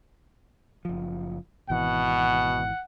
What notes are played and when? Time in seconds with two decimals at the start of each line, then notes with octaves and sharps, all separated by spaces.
0.85 F#1 F3
1.70 G#1 B2 E3 F#5